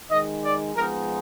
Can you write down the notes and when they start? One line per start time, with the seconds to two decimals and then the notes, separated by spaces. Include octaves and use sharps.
0.10 D#3 G#3 D#4 D#5
0.43 D5
0.75 F3 G#3 B3 D#4 A#4